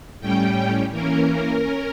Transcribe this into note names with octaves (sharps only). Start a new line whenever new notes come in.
A2 G3 C#4 G5
E3 A#3 C#4 A#4
C#4